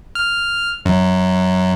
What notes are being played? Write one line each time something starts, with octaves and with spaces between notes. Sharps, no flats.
F6
F#2